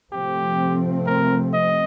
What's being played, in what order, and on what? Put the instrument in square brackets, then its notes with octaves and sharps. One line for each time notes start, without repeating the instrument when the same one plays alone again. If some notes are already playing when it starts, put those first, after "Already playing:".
[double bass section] C3 F3 A3 C4 [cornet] G4
[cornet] A#4
D#5